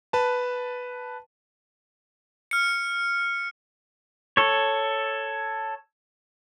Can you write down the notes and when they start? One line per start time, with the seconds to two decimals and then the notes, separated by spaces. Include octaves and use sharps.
0.13 B4 A5
2.51 F6 C#7
4.37 A4 C#5